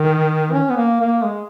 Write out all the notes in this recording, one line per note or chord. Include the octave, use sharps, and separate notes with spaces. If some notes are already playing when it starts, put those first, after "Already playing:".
Already playing: D#3
C#4
B3
A#3
A#3
G#3